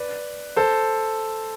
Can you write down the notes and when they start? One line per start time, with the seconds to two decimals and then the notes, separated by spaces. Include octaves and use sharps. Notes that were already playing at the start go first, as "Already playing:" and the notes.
Already playing: B4 D5
0.56 A4 C5